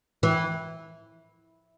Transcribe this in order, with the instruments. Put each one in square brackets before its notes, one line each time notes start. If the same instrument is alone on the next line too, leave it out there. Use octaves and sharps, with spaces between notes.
[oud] E3